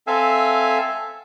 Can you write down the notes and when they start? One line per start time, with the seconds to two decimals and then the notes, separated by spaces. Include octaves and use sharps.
0.07 C4 A4 E5 F5 G#5